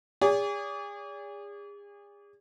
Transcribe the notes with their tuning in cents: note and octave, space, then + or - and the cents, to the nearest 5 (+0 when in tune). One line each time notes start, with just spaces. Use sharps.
G#4 -35 D5 -45